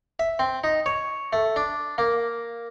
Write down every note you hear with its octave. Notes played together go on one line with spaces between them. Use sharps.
E5
C4
D#4
C#5
A3
D4
A#3